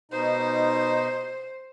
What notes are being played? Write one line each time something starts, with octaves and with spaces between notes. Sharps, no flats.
B2 D#4 C5